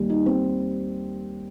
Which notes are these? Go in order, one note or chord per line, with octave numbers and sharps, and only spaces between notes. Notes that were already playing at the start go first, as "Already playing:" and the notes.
Already playing: D#2 D#3 G3
D#4
C4